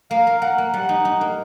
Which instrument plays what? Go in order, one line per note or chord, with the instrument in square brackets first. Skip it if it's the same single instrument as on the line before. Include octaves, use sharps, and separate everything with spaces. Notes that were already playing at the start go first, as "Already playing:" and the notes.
[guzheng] A#3 [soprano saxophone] F5
[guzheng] A#4
[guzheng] A#4 [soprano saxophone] F#5
[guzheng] A#3
[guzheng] G3 [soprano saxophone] F#5
[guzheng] D#4
D#4
A#3